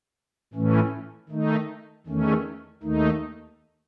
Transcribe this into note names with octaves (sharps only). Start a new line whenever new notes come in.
A2 E3 A3 C#4
D#3 A3 D#4
E2 D#3 A3 C#4
D#2 D#3 A3 D#4